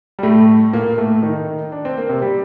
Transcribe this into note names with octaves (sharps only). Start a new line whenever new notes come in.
G3
A2 A3
A#2 A#3
A2 A3
D#3 D#4
D4
C4
A#3
C3 C4
G3 G4